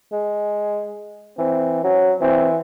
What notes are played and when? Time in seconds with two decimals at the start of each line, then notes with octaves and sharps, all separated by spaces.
0.12 G#3
1.38 E3 C4
1.84 F#3 C#4
2.21 E3 C4